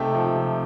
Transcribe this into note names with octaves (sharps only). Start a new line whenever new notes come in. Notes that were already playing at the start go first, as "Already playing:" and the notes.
Already playing: C3 A3 D#4 G5
F3
C3